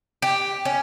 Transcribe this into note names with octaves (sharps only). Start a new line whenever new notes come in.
G4
C#4